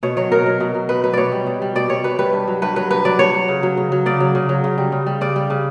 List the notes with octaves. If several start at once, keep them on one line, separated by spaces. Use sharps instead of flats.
B2 C#5
F#3 C#5
B2 A#4
F#3
B2
F#3
B2 B4
F#3 B4
B2 C#5 D5
G3
B2
G3
B2 D5
G3 C#5
B2 B4
G3 B4
G2
F#3
G2 B4
F#3 B4
G2 B4
F#3 D5
G2 C#5
F#3
C#3
F#3
C#3
F#3
C#3 D5
F#3
C#3
F#3
C#3
G3
C#3
G3
C#3 D5
G3
C#3